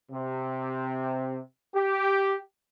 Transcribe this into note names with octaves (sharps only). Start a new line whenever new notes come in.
C3
G4